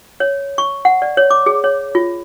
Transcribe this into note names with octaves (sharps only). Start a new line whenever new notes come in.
C#5
C#6
F#5
D5
C#5
D6
G#4
C#5
F4